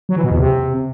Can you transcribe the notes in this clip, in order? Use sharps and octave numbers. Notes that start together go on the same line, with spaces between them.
F#3
E3
B2
E2
C3